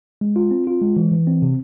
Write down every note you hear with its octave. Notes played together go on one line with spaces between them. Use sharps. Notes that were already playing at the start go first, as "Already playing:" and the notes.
G#3
F4
C4
F4
G#3
E3
E3
C4
C3